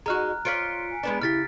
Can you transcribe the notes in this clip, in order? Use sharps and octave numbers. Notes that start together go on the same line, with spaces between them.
G#3 D#4 F#4 A#5 F6 F#6
F4 C#5 D5 B6 C#7 D7
G#5
G#3 B3 D4
C#3 E4 G4 F6 A6 B6